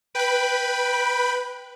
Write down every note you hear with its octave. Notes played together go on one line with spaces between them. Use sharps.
B4 G5 B5